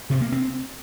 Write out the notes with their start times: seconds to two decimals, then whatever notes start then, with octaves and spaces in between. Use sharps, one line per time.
0.10 C3
0.21 A#3
0.32 C4